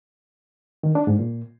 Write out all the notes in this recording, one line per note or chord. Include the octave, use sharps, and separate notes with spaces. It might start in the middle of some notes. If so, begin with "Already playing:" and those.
D#3
D4
G#2
A#2